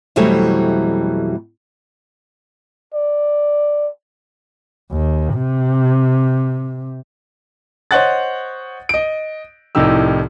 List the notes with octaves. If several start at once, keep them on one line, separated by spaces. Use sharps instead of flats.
F2 B2 E3 F#3 G3 A3
D5
D#2
C3
C5 C#5 D#5 F#5 F#6 A6
D#5 D7
C2 A2 F3 D#4 G4 E6